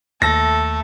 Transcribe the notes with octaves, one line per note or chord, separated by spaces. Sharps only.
D#2 A3 A4 E5 A#6